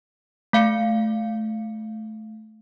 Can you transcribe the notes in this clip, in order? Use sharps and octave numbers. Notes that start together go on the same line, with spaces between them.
A3 F5 C#7